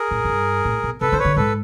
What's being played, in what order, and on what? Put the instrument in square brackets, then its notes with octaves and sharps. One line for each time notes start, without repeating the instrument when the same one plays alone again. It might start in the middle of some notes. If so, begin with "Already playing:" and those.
Already playing: [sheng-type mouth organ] G#4 A#4
[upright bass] A2
G#2
G2
A2
B2
[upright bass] C3 [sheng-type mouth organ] A4 B4
[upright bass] D3 [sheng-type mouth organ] C5
[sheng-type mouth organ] B4 C#5
[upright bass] D3
[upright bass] G#2 [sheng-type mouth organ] A4 B4